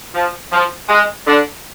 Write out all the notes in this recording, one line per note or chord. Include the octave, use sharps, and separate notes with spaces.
F3
F3
G#3
D3 D4